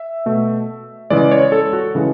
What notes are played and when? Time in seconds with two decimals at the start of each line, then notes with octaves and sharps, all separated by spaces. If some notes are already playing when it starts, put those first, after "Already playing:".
Already playing: E5
0.26 B2 A3
1.10 C#3 E3 G#3 D5
1.31 C#5
1.52 A4
1.73 F#4
1.95 C#3 E3 G#3